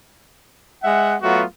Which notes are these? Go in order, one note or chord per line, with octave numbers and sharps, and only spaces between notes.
G#3 E5 F#5
F#3 A3 B3 F4 F#4